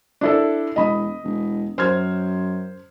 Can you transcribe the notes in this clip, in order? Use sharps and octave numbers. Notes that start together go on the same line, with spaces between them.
D4 E4 A4
E1 D#5 B5 D#6
E1
F#2 C5 F6 G#6